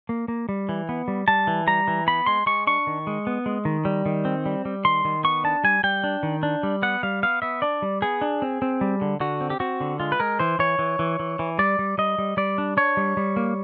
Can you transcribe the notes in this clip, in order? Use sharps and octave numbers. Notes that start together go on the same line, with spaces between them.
A#3
A#3
G3
E3
B3
G3
G3 A5
E3
G3 A#5
E3
B3 B5
G#3 C6
G#3 C#6
D4 C#6
D#3
G#3
B3
G#3
D#3
G3
D#3
C4
G3
G3
D#3 C6
D#3
B3 C#6
D4 A5
G3 G#5
G3 G5
D4
D#3
D4
G3
B3 F#5
G3 F5
B3 F5
B3 E5
D4 D5
G3
B3 G#4
D4
C4
C4
G3
D3
D3 F#4
C4
G4
C4 F#4
D3
G#3 F4
B4
G#3 A#4
E3 C5
E3 C#5
E3
E3
E3
E3
G3 D5
G3
G3 D#5
G3
G3 D5
D4
D4 C#5
G3
G3
A#3